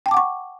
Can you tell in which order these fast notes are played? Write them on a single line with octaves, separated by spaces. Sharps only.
G5 A5 D6 F#5 C#6